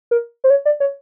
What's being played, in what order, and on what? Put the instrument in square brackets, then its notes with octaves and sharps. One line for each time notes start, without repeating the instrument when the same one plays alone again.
[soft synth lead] A#4
C5
C#5
D5
C#5